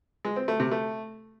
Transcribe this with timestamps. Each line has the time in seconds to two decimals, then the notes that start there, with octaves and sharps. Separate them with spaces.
0.25 G#3
0.36 C4
0.48 A3
0.60 C3
0.71 A3